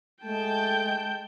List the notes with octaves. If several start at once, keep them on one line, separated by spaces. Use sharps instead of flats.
G#3 A3 G5 A5 G6